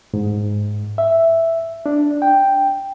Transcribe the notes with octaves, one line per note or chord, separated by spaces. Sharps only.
G#2
E5
D4
G5